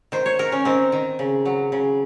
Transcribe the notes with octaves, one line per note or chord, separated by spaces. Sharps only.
D#3 C5
C#5
D#3 A#4
C#4
D#3 C4
D#3
C#3
F#3
C#3